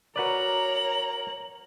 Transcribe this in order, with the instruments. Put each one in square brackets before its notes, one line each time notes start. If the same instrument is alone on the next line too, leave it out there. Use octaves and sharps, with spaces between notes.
[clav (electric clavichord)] F#4 B4 D5 [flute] A#4 [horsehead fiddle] C#5 A#5 [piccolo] F#7